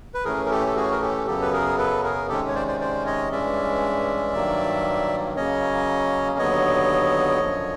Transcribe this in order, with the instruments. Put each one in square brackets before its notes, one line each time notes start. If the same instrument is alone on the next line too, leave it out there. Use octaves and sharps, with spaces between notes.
[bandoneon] B4
A2 E3 A3 C#4 G#4 A#4
A#4
G4 A4
A4
F#4 G#4
A#4
G4 A4
F#2 C#3 F#3 B3 G4 A4
B4
G#4 A#4
A4 B4
G#4 A#4
C3 D#3 G#3 C#4 G4 A4
C#5
C5 D5
C5 D5
C5 D5
C#5 D#5
G2 E3 G#3 C#4 D5 E5
G2 D#3 F#3 A#3
C#3 F#3 A#3 C#4 C#5 D#5
D#2 D3 F#3 B3 C#5 D#5
F#2 D3 F3